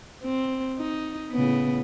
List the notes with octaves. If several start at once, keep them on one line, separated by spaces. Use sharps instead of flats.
C4
D#4
A2 C#3 B3